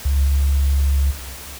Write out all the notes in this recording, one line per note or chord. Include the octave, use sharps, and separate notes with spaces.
C#2